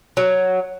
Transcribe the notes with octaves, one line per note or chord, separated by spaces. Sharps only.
F#3